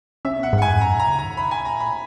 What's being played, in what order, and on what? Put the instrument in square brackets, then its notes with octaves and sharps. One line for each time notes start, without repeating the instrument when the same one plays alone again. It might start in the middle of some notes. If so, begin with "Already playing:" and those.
[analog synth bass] C#3 [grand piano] E5
[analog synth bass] B2 [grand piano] F#5
[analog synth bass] G#2
[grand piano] F#5
G#5
[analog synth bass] F#2
E2
[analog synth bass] F#2 [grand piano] A#5
[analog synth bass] A#2 [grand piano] A#5
[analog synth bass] C#3
[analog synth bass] D#3 [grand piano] A#5
[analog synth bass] C#3 [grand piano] B5
[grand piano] G#5
[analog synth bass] A#2 [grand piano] A#5
[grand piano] B5